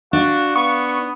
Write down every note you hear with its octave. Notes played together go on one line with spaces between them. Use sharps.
D4 F#4 F5
B3 C#6